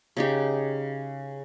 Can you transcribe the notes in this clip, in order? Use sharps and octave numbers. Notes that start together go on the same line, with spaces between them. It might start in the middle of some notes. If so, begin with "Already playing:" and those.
C#3 D#4 G4